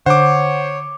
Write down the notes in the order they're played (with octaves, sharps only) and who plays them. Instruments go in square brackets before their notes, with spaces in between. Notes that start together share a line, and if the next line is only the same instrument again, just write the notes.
[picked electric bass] D3 [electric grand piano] C5 D6 [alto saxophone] C#5 [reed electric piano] F#5